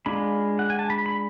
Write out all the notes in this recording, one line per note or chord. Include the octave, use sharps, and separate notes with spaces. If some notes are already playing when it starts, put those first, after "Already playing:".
G#3 D4 F4 B5
F#5
G#5
A5
B5
B5